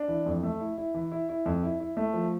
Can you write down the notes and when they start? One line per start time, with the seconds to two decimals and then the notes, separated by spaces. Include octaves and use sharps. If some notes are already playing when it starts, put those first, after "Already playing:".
Already playing: D4
0.08 E3
0.26 F2
0.43 A3
0.60 E4
0.78 E4
0.94 E3
1.12 E4
1.29 E4
1.46 F2
1.63 E4
1.80 E4
1.97 A3
2.14 F3